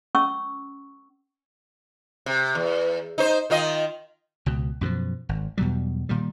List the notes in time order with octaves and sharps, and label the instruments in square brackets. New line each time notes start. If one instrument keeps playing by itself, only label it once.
[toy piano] C#4 C#6 E6
[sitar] C3
E2
D#4 C5
D#3 F4 D#5
[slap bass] C#2 B2
F#2 B2 D#3 F3
G#1
E2 B2 F#3 G3
A#2 D#3 G3